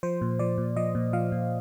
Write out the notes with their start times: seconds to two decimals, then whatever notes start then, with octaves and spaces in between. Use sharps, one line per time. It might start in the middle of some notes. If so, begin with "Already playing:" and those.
0.03 F3 C5
0.21 A#2
0.39 F3 D5
0.58 A#2
0.76 F3 D#5
0.95 A#2
1.13 F3 F5
1.32 A#2